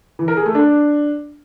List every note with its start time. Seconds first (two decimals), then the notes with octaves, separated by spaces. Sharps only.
0.19 E3
0.28 A#4
0.37 G#4
0.46 A3
0.55 D4